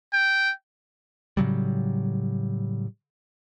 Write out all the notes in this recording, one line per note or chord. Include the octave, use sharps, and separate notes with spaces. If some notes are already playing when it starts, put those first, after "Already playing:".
G5
A2 C#3 F#3 G3